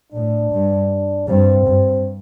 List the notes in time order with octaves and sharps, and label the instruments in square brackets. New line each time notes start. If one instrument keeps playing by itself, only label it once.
[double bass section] A2 [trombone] D4
[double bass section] G2
[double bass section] G2 [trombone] C4
[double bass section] G2